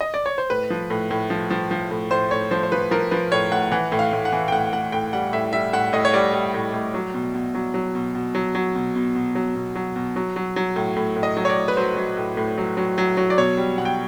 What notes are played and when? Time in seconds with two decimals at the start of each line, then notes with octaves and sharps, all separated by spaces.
0.01 D#5
0.14 D5
0.26 C#5
0.38 C5
0.50 A2 B4
0.70 F3
0.90 A2
1.11 A2
1.30 F3
1.50 F3
1.71 F3
1.91 A2
2.10 A2 C5
2.31 A2 C#5
2.51 F3 C5
2.63 C5
2.72 F3 B4
2.91 F3 A#4
3.11 F3 B4
3.32 A2 C#5
3.51 A2 F#5
3.72 E3 F#5
3.92 A2
3.99 F5
4.13 A2
4.25 F#5
4.32 E3
4.48 G5
4.52 A2 F#5
4.73 A2 F#5
4.92 A2 G5
5.13 G3 F#5
5.33 A2 E5
5.53 G3 E5
5.73 A2 F#5
5.93 A2 D#5
6.05 C#5
6.14 G3 D5
6.33 G3
6.54 A2
6.74 A2
6.94 F#3
7.14 B2
7.34 B2
7.55 F#3
7.74 F#3
7.95 B2
8.15 B2
8.35 F#3
8.55 F#3
8.75 B2
8.95 B2
9.15 B2
9.35 F#3
9.55 B2
9.75 F#3
9.96 B2
10.16 F#3
10.36 F#3
10.56 F#3
10.76 A2
10.96 A2
11.16 A2
11.23 D#5
11.37 F#3
11.45 C#5
11.50 D5
11.57 A2
11.68 B4
11.77 F#3 C5
11.97 F#3
12.17 A2
12.37 A2
12.58 F#3
12.77 F#3
12.98 F#3
13.17 F#3
13.30 D5
13.37 B2 C#5
13.57 G3
13.78 B2 F#5
13.85 G5